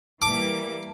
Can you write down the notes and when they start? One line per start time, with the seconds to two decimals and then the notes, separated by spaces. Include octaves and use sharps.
0.22 E3 G3 A#3 A5 D6